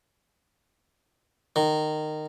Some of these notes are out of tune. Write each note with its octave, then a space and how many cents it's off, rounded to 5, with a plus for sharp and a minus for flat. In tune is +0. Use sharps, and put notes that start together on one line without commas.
D#3 -20